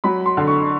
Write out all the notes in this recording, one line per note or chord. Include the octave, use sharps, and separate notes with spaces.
F#3 B5
C6
D3
C#6